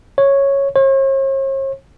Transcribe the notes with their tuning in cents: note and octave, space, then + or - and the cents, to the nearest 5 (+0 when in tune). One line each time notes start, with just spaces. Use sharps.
C#5 -5
C#5 -45